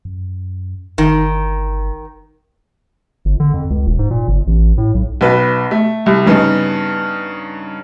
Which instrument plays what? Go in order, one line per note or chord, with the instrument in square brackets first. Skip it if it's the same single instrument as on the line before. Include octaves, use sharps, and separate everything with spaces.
[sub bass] F#2
[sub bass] G1 [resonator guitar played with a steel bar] D#3
[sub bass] G1
D3
F2
C#2
E1
G#2
A#2
G1
A1
A2
B1
[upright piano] B1 B4
A3
C2 C3
G2 C#3 B3 D#4